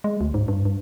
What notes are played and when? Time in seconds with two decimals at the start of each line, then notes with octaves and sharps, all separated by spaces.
0.04 G#3
0.21 D2
0.34 G#2
0.48 G2
0.65 G2